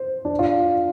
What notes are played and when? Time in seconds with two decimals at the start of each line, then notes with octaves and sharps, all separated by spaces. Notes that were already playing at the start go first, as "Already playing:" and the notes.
Already playing: C5
0.25 D4
0.39 F4